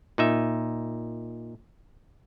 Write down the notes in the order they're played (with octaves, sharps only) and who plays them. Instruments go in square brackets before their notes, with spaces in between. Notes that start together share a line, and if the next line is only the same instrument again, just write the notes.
[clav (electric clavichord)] A#2 D#4 E5